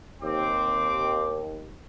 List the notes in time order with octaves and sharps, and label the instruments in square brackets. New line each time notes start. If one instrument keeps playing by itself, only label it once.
[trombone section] D#2 [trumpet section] C4 D6